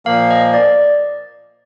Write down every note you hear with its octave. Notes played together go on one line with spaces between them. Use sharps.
A#2 F3 A#3 F5
D#5
D5